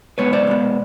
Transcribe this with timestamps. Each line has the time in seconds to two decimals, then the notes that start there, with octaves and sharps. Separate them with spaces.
0.18 B2 G#3 B3 B4 C#5
0.33 C5 D5
0.47 B2 G#3 B3